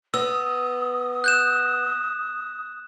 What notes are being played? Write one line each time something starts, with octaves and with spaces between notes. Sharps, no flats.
B3 D#6 E6
F#6 G6 E7